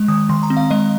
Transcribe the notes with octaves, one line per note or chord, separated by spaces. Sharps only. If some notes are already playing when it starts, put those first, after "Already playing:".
Already playing: G#3
D#3 D#6
D#3 C6
A#5
C4
F5
G#3 D#5